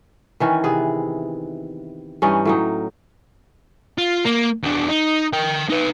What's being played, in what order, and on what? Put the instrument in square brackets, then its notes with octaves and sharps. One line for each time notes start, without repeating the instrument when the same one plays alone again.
[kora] D#3 E3 C#4
C3 B3 G#4
G2 E3 C#4 D#4
A2 F#3 D#4
[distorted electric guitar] F4
A#3
E2 D4
D#4
A#4 G5
D#4 B4